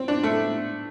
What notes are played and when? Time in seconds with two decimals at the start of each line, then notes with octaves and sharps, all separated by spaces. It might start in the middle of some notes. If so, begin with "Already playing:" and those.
Already playing: C4
0.08 D4
0.23 A3